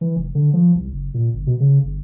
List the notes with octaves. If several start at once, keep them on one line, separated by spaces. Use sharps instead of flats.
E3
F1
D3
F3
C2
F#1
A#2
G1
B2
C#3
G1